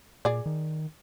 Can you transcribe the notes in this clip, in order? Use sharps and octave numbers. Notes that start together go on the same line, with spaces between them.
A#2 G#4 D5
D#3